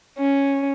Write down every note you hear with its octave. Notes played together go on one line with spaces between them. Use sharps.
C#4